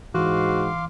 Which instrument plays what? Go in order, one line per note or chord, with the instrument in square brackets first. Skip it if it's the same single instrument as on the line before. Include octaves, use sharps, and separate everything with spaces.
[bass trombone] G#2 [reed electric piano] E3 [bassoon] F#4 [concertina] F5 C6 D6